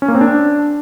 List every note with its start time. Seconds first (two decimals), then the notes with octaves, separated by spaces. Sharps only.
0.02 C#4
0.08 A#3
0.15 C4
0.21 D4